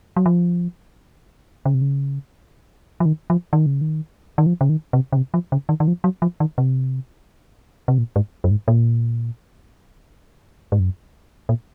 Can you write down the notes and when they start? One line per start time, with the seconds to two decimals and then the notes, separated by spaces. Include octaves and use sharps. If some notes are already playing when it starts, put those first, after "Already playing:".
0.16 F#3
0.26 F3
1.65 C#3
1.74 C3
1.81 C#3
3.00 F3
3.05 D#3
3.30 F3
3.53 D#3
3.66 C#3
3.81 D#3
4.38 D#3
4.46 F3
4.61 C#3
4.69 D#3
4.93 C3
5.12 C#3
5.17 C3
5.34 F3
5.52 C#3
5.69 D#3
5.80 D#3
5.88 F3
6.04 F#3
6.22 F3
6.40 D#3
6.58 C3
7.88 C3
7.98 A#2
8.16 G#2
8.44 F#2
8.51 G#2
8.68 A#2
10.72 G#2
10.79 F#2
11.49 A#2